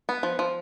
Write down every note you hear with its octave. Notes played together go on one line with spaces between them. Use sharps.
B3
F3
F3